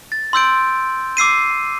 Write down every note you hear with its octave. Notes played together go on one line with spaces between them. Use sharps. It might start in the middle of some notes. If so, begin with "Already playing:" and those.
A6
C6 E6 G6 D7
D6 E6 C7 D#7